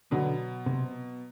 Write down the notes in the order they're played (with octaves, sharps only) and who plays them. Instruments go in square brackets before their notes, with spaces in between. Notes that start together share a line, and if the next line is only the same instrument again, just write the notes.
[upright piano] B2 F#3 B3 [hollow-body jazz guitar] D3
[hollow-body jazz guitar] C3